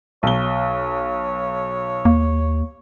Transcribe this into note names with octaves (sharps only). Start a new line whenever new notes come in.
B1 C#5 G7
D#2 A#3